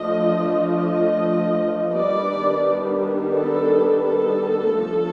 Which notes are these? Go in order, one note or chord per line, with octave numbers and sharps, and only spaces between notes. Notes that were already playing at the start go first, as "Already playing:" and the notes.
Already playing: F3 A3 D4 D#5
D#5
D#3 G3 B3 D4 D5
A4
A4
D3 F3 A3